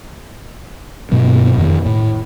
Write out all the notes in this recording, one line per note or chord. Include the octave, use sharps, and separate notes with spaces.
G2 B2 F#3 B3
F2 D#3
A2